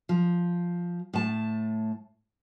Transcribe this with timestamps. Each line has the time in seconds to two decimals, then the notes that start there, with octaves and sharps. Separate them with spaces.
0.09 F3
1.13 A2 A5